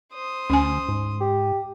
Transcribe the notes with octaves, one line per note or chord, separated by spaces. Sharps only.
C5 D#6
D2 C#4 G#5
G#2
G4